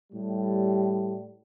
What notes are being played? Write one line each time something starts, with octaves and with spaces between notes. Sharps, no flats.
A2 G3